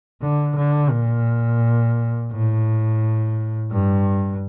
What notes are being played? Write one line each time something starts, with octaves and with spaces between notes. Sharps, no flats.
D3
D3
A#2
A2
G2